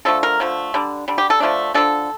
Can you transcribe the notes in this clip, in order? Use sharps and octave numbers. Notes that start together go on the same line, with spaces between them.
D3 F3 A3 A4
A#4
D3 F3 A3
D3 G3 D4
D3 G3 D4
G4
A4
D3 F3 A3 D4
D3 F3 A3 D4 A4